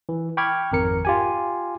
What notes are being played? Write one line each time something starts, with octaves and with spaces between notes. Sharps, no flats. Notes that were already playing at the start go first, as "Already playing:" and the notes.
E3
G5 B5 C#6 D6 F6 G#6
G#1 F2 A#4 C#7
F4 G4 G#5